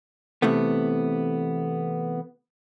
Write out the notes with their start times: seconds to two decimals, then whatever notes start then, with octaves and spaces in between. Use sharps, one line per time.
0.42 C3 E3 A3 B3